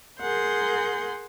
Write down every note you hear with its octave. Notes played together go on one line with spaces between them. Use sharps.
G#4 A#4 F#5 C6 G6